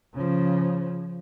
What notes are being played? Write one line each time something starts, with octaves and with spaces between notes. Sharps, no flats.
C#3 F3